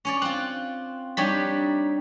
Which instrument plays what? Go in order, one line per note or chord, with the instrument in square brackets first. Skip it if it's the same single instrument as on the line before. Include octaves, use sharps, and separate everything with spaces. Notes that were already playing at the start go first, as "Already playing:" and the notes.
[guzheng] C#4 C#5 D5
[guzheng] C4 F4 [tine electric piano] F#6
[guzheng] G3 D4 D#4 [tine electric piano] G4 C#5 B6